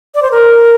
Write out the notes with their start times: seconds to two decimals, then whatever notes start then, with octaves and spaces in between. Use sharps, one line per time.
0.15 D5
0.22 C5
0.31 A#4